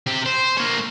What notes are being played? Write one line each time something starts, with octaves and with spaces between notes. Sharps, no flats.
C3 G4
C5
A#3 C#5